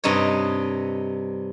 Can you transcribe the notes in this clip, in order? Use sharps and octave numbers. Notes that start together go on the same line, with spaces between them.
G2 C3 D#4 C#5